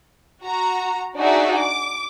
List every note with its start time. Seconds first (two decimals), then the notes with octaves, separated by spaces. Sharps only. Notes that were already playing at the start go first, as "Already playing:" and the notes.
0.43 F#4 A#5
1.16 D4 D#4 F#4 G#4 D5 E5
1.60 D6